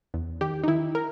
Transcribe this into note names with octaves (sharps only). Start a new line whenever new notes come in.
E2
D#3 G4
D#4
D#3 E4
A#4